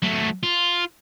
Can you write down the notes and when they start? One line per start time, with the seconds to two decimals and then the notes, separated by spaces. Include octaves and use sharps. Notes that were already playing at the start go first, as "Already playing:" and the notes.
0.02 F#3 A3
0.43 F4